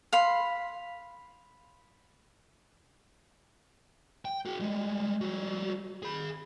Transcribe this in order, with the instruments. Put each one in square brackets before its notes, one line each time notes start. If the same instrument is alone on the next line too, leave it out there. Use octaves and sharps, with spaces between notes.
[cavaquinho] F5 B5 C6
[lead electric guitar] G5
F#4 G#4
G3 G#3
G3 F#4
G#4 B5